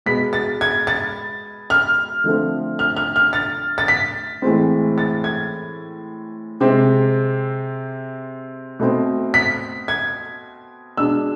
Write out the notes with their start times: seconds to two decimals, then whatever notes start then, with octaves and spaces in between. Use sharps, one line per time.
0.06 B2 G#3 B3 B6
0.33 A6
0.61 G#6
0.87 A6
1.70 F6
2.24 D3 F3 A3 C4
2.79 F6
2.97 F6
3.16 F6
3.33 A6
3.78 A6
3.88 B6
4.42 A2 E3 G#3 C4
4.98 A6
5.24 G#6
6.61 C3 G#3 C4
8.80 B2 A3 C4
9.34 B6
9.88 G#6
10.97 B2 G#3 D4 E6